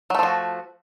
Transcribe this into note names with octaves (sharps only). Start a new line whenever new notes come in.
F3 F#3 A3 F#4